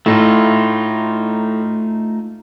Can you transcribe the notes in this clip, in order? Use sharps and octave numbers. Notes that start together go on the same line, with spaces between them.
A2 A3 D#4 F4